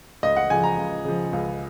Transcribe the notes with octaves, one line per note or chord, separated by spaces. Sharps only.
C#2 D#5
F#5
C#3 F3 G#5
A#5
C#2
C#3 F3
C#2